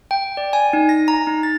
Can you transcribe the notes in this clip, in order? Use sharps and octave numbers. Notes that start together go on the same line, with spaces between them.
G5
D5
G#5
D#4
A#6
A#5
D#4
A6